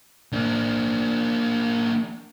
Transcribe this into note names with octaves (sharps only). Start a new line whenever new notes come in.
A#3 D4